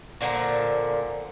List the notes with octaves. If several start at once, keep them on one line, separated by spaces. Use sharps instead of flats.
A#2 D3 F3 A#5